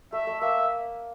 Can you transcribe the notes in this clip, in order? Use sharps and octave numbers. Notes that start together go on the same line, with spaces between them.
A3 E5
A3
A#3 E5